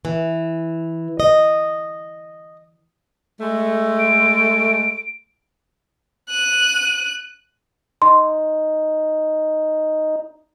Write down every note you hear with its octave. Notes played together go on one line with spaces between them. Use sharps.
E3
D#5
G#3 A3
D7
F#6 D#7
D#4 C6